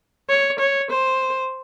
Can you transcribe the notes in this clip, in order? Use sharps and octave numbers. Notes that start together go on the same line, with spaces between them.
C#5
C#5
C5